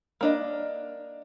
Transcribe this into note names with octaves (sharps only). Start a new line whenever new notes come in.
A#3 D4 D#5